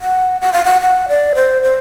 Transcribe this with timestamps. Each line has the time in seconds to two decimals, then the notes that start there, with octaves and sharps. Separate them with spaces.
0.01 F#5
0.41 F#5
0.53 F5
0.65 F#5
0.81 F#5
1.09 D5
1.35 C5
1.62 C5